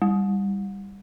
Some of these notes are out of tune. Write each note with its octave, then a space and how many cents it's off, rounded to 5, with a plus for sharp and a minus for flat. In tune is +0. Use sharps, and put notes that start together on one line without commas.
G3 +15